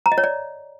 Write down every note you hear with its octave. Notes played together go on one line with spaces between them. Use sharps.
A#5
D#5
C#5
D5